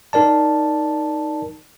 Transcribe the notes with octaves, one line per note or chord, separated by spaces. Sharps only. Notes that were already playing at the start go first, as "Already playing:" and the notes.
D#4 A#4 D5 A5